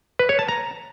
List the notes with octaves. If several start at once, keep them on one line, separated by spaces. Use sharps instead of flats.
B4
C#5
A5
A#5